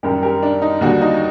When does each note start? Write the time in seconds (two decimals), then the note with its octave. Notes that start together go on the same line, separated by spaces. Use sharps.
0.03 F#2 D#3 G3 G4 A#4
0.23 G4 A#4
0.42 D4
0.62 D#4
0.81 D#2 D3 G3 D4 F#4
1.01 D#4